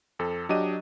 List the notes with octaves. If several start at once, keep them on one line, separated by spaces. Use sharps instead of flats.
F2 A4
F#3 D4 G4 D#5 D#7